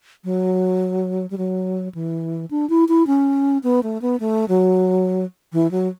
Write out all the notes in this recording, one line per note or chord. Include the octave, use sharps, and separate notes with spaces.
F#3
G3
F#3
E3
D4
E4
E4
C#4
B3
A3
B3
A3
F#3
E3
F#3